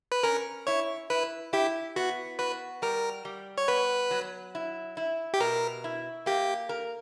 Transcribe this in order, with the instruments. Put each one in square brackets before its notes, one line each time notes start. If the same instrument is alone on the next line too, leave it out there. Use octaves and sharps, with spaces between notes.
[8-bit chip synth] B4
[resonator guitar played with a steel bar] C#4 [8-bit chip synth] A#4
[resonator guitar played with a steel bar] E4 [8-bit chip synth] C#5
[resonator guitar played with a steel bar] E4 [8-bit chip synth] B4
[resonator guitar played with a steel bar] E4 [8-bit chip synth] G4
[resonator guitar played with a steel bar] B3 [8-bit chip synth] F#4
[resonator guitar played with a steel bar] F#4 [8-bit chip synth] B4
[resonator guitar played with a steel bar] G3 [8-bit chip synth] A#4
[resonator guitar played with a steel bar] G3
[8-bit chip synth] C#5
[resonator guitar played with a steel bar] B3 [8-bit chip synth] B4
[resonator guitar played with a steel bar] F#3
E4
E4
[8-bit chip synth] G4
[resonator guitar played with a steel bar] B2 [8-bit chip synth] A#4
[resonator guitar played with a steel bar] E4
[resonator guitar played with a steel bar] A#3 [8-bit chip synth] G4
[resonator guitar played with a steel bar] A#4